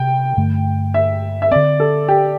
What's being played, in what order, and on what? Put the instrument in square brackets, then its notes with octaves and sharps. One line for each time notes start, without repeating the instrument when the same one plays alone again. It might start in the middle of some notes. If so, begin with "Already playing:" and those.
Already playing: [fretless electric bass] C3 [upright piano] G5
[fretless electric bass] G2 D3 A3
[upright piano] E5
E5
[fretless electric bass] D3 C4 [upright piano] D5
[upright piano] A4
G4